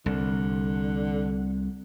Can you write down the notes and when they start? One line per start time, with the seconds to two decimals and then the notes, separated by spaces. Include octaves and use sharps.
0.06 C2 D3